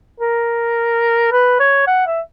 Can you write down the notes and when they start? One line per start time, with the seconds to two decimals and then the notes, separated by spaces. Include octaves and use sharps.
0.20 A#4
1.32 B4
1.60 C#5
1.87 F#5
2.07 E5